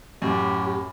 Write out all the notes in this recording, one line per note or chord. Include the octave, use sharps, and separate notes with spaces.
F#2 A2 G4